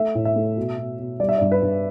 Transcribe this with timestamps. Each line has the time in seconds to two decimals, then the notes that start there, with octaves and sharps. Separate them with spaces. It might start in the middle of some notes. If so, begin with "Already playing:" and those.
Already playing: A3 E5
0.15 A2
0.25 E5
0.36 A3
0.57 B2
0.78 B2
0.99 B2
1.20 G3 D5
1.29 E5
1.38 G2 D5
1.52 B4
1.62 G2